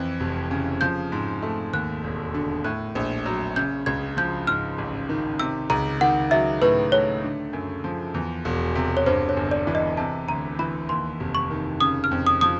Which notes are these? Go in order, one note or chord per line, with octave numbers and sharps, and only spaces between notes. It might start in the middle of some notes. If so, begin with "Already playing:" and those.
Already playing: F2 E3
F1
C#3
F3 G6
G#2
A3
D#2 F#6
E1
D3
A2 F#6
A#1
F#3
C#3 G6
C#2 G#6
F3 G6
G#2 F6
A1
D#3
C3 E6
C#2 A#5
D#3 F#5
F#3 E5
A2 B4
A3 C#5
D3
F#2
F3
E2
E1
C3
C#5
G2 C5
C#5
G1
D5
E3
D#5
C3 A5
D2 A#5
E3 B5
D#2 C6
F1
C#6
D#3
C#3 D#6
F6
F2
D#6
F3 D#6